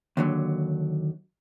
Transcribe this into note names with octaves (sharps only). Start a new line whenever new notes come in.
D#2 D3 F#3